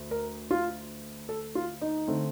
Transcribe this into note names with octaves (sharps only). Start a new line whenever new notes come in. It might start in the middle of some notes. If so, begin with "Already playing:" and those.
Already playing: D2
A#4
F4
A4
F4
D#4
D3 A3 C4